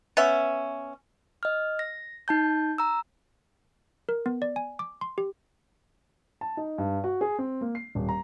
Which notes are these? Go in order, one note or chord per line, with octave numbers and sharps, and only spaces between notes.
B3 C#4 E5
D#5 F6
A#6
D#4 A5 G6
A#5 E6
A#4
B3
D5
G#5
D6
C6
G4
A5
D#4
G2
F#4
G#4
C4
A#3
C7
D#1
A#5